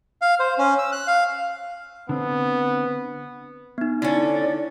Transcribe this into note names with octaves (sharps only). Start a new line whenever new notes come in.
F5
C5
C#4
E6
F#6
F5
D3 B3 C4
B3 D#4
D3 C#4 D#4 E4 D5